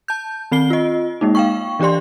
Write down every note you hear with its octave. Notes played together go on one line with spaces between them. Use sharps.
A5 G6
D#3 C4 C7 G7
F4 D#5
G#3 A#3 D#4
F5 G5 C#6
E3 D4 G4 D5 C6